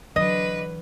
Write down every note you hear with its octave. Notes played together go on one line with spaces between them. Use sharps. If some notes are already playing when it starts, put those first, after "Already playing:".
D3 E3 F#3 B4 D#5